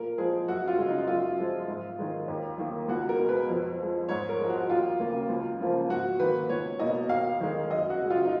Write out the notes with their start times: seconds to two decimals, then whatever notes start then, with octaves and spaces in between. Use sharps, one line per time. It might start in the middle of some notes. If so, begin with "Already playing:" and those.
Already playing: A#2 A#4
0.18 F3 G#3 G#4
0.48 F#2 F#4
0.68 F4
0.78 C#3 G#3
0.89 D#4
1.08 F#2 F4
1.39 F3 G#3
1.68 G#2
1.99 D#3 G#3
2.28 D#2
2.58 D#3 A#3
2.88 C#2 F#4
3.09 A#4
3.19 B2 G#3
3.29 B4
3.49 F2
3.79 F3 G#3
4.09 G#2 C#5
4.29 A#4
4.39 F3 G#3
4.49 F#4
4.69 D#2 F4
4.99 C#3 F#3 A#3
5.29 C#2
5.60 C#3 F3 A#3
5.89 G#2 F#4
6.20 D#3 F#3 A#3 B4
6.49 C#2 C#5
6.79 B2 A#3 D#5
7.09 D#2 F5
7.40 D#3 G#3
7.70 F#2 D#5
7.90 F#4
8.00 C#3 G#3
8.10 F4
8.25 D#4